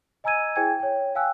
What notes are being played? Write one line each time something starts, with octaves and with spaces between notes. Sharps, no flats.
D#5 G#5 A#5 E6 G#6 D#7
E4 G#4 C5 G5 G#5 G#6
C#5 G5
F5 G5 G#5 E6 F#6